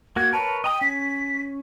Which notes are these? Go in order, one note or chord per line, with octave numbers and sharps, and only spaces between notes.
A#3 F#4 G#6
A#4 B4 C#5 A5
D#5 G5 A#5 D#6
C#4 B6